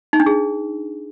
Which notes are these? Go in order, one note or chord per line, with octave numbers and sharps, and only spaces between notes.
D#4
D4
G#4